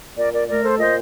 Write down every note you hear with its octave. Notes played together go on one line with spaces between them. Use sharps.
A#2 A#4 D5
A#4 D5
A3 A#4 D5
A4 C5
A#2 C5 D#5